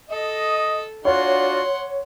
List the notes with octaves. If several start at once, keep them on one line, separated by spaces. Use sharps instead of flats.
A4 D#5
D4 F4 F#4 C#5 F#5 C6